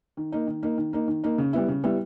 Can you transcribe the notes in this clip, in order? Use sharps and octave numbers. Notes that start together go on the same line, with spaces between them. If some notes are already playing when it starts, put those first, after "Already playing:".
D#3
A#3 D#4
D#3
A#3 D#4
D#3
A#3 D#4
D#3
A#3 D#4
C#3
G3 B3 E4
C#3
G3 B3 E4